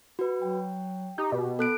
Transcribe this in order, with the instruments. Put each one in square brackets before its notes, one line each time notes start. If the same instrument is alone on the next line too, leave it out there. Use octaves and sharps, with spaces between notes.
[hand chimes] F#4 B4
[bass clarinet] F#3 [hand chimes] G5
[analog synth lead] D#4 [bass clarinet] G4
[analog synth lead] B2
[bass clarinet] B3 [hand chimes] A4 F#6 D7